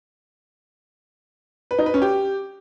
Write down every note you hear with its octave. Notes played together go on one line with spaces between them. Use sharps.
B4
D#4
B4
C#4
G4